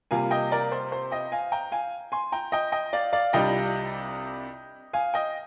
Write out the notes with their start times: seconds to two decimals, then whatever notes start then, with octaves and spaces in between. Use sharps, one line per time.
0.11 C3 G3 A#3 F4 F5 G#5
0.31 D#5 G5
0.51 A#4 D5
0.72 C5
0.92 C5
1.12 D#5 G5
1.32 F5 G#5
1.52 G5 A#5
1.72 F5 G#5
2.12 G#5 C6
2.32 G5 A#5
2.52 D#5 G5
2.72 D#5 G5
2.93 D5 F5
3.13 D5 F5
3.33 C2 C3 G3 D4 F4 D#5 G5
4.93 F5 G#5
5.14 D#5 G5